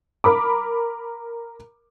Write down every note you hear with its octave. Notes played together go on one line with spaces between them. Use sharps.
A#4 B5 D6